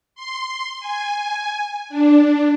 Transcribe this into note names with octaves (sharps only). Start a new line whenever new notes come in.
C6
G#5
D4